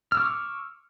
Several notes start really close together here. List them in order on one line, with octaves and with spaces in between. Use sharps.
F6 E6 D6 C#6